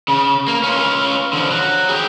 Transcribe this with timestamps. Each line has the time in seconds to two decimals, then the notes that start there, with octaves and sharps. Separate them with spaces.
0.08 C#3
0.48 A#3
0.63 C#4 F4
1.33 D3 F3
1.51 F#3
1.89 G#4 G5